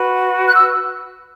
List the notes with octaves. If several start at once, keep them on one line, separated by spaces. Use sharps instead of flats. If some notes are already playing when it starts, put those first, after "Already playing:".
Already playing: F#4 B4
F#6
E6